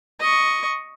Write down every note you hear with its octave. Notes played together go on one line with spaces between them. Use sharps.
D#5 C#6